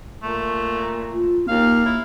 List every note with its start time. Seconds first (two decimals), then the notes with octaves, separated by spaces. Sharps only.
0.23 A#2 A3
1.11 F4
1.48 D#2 A#3 F5
1.86 E4